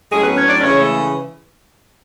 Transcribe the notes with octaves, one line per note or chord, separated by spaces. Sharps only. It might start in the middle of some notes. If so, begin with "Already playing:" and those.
A2 F#3 G#3 C#4 G#4
B3 B4
C#4 C#5
D4 D5
C#3 E3 G#3 C#4 C#5
A3 A4